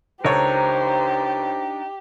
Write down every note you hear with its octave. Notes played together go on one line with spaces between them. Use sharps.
C#2 D4 D#4 G4 A4 A#4 C5 C#5